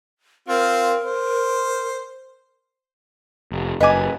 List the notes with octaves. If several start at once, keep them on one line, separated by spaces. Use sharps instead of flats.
C4 F4 A#4
C5
F1
F#1 B4 D#5 G#5 D6